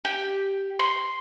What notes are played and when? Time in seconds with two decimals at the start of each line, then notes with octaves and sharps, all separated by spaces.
0.05 G4
0.79 C6